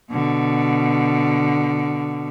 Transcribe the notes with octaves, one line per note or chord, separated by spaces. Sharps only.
B2 D3